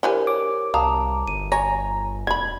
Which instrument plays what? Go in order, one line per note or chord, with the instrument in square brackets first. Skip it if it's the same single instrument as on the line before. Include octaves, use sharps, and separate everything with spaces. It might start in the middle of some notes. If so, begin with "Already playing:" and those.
[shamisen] D3 E3 G#5 [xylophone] G4 A#4 C5
[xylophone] C#5 [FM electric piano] D6
[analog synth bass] C2 [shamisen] F5 [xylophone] A5 A#5 D#6
[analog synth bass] G1 [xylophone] D#7
[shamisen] C#5 [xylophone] G#5 [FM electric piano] A#5
[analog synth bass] F1 [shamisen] D3 B5 [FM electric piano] G#6